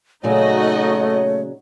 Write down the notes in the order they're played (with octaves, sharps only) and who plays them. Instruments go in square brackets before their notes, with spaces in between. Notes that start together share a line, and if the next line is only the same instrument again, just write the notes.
[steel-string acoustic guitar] A#2 C#3 F#3 [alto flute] A3 [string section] D#4 F#4 D#5 [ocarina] C#5